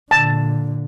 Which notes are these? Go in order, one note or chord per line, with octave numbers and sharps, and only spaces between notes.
A#2 D3 A5